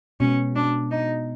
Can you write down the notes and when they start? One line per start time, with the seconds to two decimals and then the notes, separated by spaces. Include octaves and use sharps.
0.20 B2 G#3 B3 C#4
0.56 D4
0.91 D#4